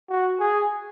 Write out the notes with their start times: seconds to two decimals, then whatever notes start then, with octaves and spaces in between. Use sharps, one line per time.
0.09 F#4
0.40 G#4